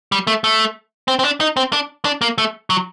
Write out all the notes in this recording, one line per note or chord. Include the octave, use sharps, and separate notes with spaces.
G3
A3
A3
C4
C4
D4
D#4
C4
D4
D4
A#3
A3
F#3